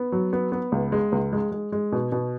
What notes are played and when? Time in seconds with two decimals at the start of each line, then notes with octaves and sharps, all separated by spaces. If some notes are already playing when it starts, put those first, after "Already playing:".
Already playing: B3
0.12 F#3
0.33 B3
0.52 B3
0.72 C#2
0.92 G#3
1.12 C#2
1.33 G#3
1.52 G#3
1.72 G#3
1.92 B2
2.12 B2